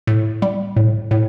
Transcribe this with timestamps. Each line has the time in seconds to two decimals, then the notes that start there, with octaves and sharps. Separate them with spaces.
0.07 A2
0.42 G3
0.76 A2
1.11 A2